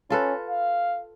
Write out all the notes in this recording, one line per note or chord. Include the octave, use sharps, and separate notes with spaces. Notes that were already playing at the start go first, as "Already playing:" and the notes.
C#4 F4 A4 B4
F5